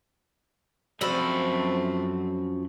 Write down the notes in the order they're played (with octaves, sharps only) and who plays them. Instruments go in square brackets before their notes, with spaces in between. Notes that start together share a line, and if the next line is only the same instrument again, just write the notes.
[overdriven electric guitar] F#2 B5 [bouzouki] F3 F#4 A4 [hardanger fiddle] A3 C4